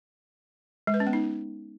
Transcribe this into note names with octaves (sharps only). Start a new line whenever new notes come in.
G#3
B4
C#4
B3
D#4